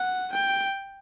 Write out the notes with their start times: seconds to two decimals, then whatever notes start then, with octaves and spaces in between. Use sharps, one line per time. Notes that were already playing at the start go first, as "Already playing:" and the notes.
Already playing: F#5
0.32 G5